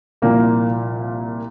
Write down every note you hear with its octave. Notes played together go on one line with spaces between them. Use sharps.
C2 A#2 F3 A#3